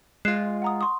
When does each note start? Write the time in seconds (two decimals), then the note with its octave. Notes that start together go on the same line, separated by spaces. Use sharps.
0.25 G#3 F4 F#6 C7 E7
0.62 F#5 A#5 D#6
0.81 C6 C#6 D#6